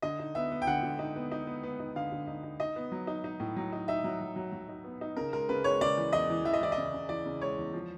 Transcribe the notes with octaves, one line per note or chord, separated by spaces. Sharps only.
D3 D#5
D#4
B3 E5
B3
G5
D3 F#5
D3
D#4
B3
D#4
B3
B3
D#4
D3 F5
D3
D#4
D#4
D#4 D#5
B3
F#3
D#4
D#4
A2
F#3
D#4
D#4 E5
F#3
F#3
F#3
F#3
D#4
B3
D#4
C#3 A#4
G#3 A#4
C#3 B4
G#3 C#5
C#3 D5
E3
E2 D#5
E3
E3 E5
D#5
E3 D5
D#5
C#3
C#3
E3 D5
C#3
G#3 C#5
E2
F3